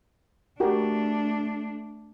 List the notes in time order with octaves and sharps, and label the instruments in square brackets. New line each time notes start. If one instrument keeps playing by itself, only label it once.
[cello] A3 D4 [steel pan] F#4 G4 A#4